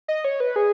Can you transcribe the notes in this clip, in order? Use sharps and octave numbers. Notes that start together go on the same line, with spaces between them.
D#5
C#5
B4
G#4